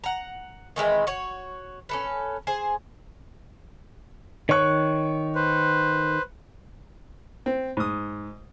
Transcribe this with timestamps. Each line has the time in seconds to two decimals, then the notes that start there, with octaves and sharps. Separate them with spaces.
0.04 F#5 A#5
0.76 D#3 E3 G#3 C4
1.07 F#4 C#5
1.89 C#4 A4 B4
2.47 G#4 C5 G#5
4.49 D#3 C#5 C#6 F#6
5.35 B4 C5
7.46 C4
7.77 G#2 D#6